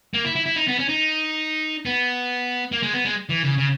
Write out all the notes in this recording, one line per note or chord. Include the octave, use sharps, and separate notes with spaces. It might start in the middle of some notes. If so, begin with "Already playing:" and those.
A#3
E4
E4
E4
D#4
B3
C#4
D#4
B3
A#3
G#3
B3
G#3
E3
C#3
C#3